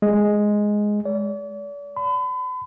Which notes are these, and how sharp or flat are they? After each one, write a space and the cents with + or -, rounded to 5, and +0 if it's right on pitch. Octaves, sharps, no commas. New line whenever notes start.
G#3 +0
D5 -40
B5 +40